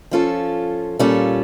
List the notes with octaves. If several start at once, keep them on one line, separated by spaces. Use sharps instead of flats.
F3 C#4 F4 A4
A#2 G3 C#4 F4 A4